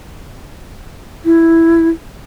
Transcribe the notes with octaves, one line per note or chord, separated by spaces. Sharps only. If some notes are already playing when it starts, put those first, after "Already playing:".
E4